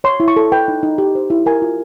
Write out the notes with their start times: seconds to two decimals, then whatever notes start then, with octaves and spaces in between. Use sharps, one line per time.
0.04 C#5 C6
0.20 E4
0.28 C#6
0.36 A4
0.52 B4 G5
0.68 D#4
0.83 D#4
0.98 G4
1.15 C5
1.30 E4
1.46 A#4 G#5
1.62 F4